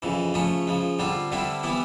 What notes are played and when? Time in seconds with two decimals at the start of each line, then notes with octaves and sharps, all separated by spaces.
0.02 F2 C#3 E3
0.34 C#3 F3 A3 C#4
0.67 C#3 F3 G#3
0.99 D3 G3 C4 F4
1.31 G2 D3 G3 C4 E4
1.63 E3 G3 B3 E4